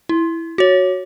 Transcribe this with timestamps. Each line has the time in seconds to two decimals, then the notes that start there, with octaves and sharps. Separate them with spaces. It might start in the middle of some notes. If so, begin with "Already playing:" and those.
0.09 E4
0.58 F#4 C#5